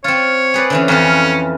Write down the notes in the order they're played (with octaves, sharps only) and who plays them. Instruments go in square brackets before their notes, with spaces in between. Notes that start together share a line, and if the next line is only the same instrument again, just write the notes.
[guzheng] C4 F4 [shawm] C#5
[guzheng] G#4 B4 D5
D3 E3 C#4
[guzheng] F2 E3 F4 [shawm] C#4